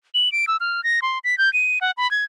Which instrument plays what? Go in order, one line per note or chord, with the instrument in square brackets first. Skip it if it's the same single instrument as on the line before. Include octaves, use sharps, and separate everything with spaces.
[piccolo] F#7
D7
E6
F6
A#6
C6
B6
G6
D#7
F#5
B5
G#6